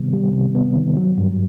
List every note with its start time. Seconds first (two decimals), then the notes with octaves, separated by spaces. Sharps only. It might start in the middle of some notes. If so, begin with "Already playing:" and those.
Already playing: C3 D#3 G3 B3
0.13 G3
0.33 C3
0.55 B3
0.75 D#3
0.97 F#3
1.18 G2